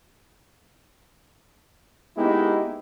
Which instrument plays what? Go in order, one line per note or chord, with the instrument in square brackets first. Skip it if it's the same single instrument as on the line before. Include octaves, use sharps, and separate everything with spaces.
[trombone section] G#3 A#3 B3 D#4 E4 G4